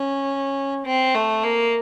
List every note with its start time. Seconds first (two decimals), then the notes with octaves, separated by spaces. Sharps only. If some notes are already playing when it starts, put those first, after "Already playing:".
Already playing: C#4
0.86 C4
1.15 A3
1.44 A#3